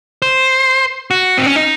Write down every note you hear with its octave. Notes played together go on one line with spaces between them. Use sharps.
C5
F#4
C4
C#4
D#4